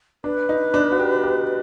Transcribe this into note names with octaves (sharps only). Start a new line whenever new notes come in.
D4 B4
D#4
D4
F#4
G4
G4